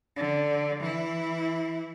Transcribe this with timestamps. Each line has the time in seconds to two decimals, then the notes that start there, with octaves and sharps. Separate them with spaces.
0.17 D3
0.79 E3 E4